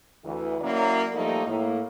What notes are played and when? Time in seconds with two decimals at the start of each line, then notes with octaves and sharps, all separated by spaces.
0.24 D2 E3
0.61 F#3 A#3 C#4 E4 A#4 D5
1.14 F3 G3 A3 A#3 D#4
1.46 A2 A#3